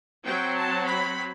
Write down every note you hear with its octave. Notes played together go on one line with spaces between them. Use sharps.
F#3 C4 G5
A5
B5